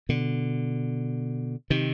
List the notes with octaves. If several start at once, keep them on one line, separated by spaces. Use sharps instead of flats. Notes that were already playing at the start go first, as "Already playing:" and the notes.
B2 D3
C3 D#3